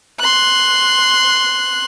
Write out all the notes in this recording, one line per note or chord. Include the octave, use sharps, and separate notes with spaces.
C6 F#6